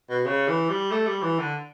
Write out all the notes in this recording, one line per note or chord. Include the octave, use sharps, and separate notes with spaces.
B2
C#3
E3
G3
A3
G3
E3
D3